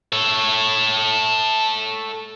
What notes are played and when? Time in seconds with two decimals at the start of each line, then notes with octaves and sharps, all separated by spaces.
0.12 A4 C#5